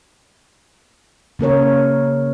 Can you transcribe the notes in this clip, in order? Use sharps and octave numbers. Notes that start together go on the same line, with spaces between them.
C#3 A#3 A#4 C#5